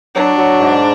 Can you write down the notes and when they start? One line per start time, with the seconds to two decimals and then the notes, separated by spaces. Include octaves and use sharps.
0.15 F#3 D4
0.37 F#3
0.60 G#2